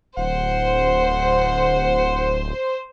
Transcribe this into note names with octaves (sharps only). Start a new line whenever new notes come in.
D1 C5 F#5